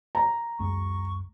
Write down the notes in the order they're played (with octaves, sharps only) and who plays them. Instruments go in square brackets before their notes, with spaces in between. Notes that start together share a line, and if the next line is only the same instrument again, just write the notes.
[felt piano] A#5
[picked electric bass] C#2 F#2 G#3 [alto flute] C#6